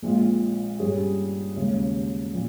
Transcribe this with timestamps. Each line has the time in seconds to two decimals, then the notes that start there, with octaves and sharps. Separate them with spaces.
0.02 A#1 A#2 G#3 C4 F4
0.79 G2 G3 C#4 G#4 C#5
1.56 D#2 C#3 G#3 C#4
2.33 A#2 F3